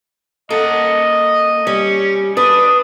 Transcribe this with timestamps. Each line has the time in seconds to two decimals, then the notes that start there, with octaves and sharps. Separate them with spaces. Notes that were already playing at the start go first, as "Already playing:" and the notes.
0.50 A#3 A4 D#5 F#5
1.67 G3 C#4
2.37 D4 B4 D#6